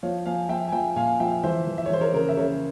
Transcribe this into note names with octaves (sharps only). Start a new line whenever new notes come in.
F3 C#5 F5
F3 F5 G#5
F3 E5 G5
G#5
F3 E5 G5
A#2 F5 G#5
F3 E5 G5
E3 C5 E5
E3
E5
C#5
E3 C5
A#4 C#5
C#3 A#4
E5
C#3 A#4 C#5